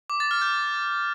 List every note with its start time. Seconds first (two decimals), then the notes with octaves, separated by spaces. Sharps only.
0.10 D6
0.20 A6
0.31 F6
0.42 G6